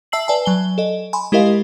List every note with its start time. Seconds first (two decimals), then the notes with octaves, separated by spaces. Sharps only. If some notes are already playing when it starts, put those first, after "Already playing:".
0.12 E5 A5 E6 C7 F#7
0.28 B4 D5 G#5 A5
0.45 F#3 G#5 G7
0.78 A4 D#5
1.13 G#5 B5 C6
1.32 G#3 E4 G4 A#4 D#5 F5